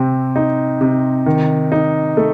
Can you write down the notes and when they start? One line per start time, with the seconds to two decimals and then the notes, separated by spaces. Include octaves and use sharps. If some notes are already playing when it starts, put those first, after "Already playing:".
Already playing: C3 C4
0.36 D#4
0.81 C3
1.26 D#3
1.72 D#4
2.17 A3